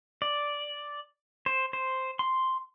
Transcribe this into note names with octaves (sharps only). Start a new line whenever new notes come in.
D5
C5
C5
C6